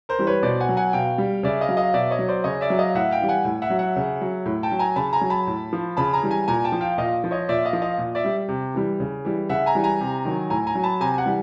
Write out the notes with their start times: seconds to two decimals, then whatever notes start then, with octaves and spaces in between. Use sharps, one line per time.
0.09 A#4 C5
0.19 E3 G3
0.27 B4 C#5
0.43 B2 C5 D5
0.60 F#5 G#5
0.69 F#3
0.77 F#5 G#5
0.93 B2 F5 G5
1.18 G3
1.43 C#3 D5 E5
1.61 D#5 F5
1.69 F#3
1.77 D#5 F5
1.94 B2 D5 E5
2.10 C#5 D#5
2.19 F#3
2.28 C5 D5
2.44 C#3 C#5 D#5
2.61 D5 E5
2.70 F#3
2.79 D#5 F5
2.95 A2 E5 F#5
3.11 F5 G5
3.21 E3 G3
3.29 F#5 G#5
3.45 A2
3.62 E5 F#5
3.70 F#3
3.79 E5 F#5
3.96 C#3
4.22 F#3
4.46 A2
4.63 G5 A5
4.72 F#3
4.79 G#5 A#5
4.96 C#3 A5 B5
5.13 G#5 A#5
5.22 F#3
5.30 A5 B5
5.47 A2
5.73 F3
5.97 C#3 A5 B5
6.13 G#5 A#5
6.22 E3 G3
6.31 G#5 A#5
6.48 A#2 G#5 A#5
6.64 G5 A5
6.72 F3
6.81 F5 G5
6.98 A#2 D#5 F5
7.24 F3
7.31 C#5 D#5
7.49 A#2 D5 E5
7.65 D#5 F5
7.73 F3
7.82 D#5 F5
7.98 A#2
8.15 D5 E5
8.24 G3
8.48 C3
8.75 E3 G3
9.00 C#3
9.25 E3 G3
9.49 C#3 E5 F#5
9.66 G#5 A#5
9.75 E3 G3
9.83 G#5 A#5
10.00 C3
10.25 D#3 F#3
10.50 A2 G#5 A#5
10.67 G#5 A#5
10.75 F#3
10.84 A5 B5
11.00 C3 G#5 A#5
11.18 F#5 G#5
11.26 E3 G3